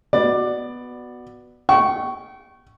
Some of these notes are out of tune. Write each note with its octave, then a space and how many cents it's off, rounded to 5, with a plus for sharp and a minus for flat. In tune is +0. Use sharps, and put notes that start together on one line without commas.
B3 +0 F#4 +0 D5 +15
G5 -35 C#6 +0